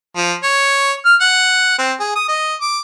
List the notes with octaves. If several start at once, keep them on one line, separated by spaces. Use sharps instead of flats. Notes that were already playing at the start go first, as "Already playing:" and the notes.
F3
C#5
F6
F#5
C4
G#4
D#6
D#5
D6